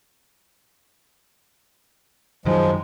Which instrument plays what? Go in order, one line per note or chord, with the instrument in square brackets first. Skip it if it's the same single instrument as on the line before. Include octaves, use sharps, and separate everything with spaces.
[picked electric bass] F#2 D#3 F#3 [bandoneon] F3 G#3